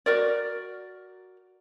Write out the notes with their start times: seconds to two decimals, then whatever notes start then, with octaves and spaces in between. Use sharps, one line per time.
0.06 F#4 A#4 D5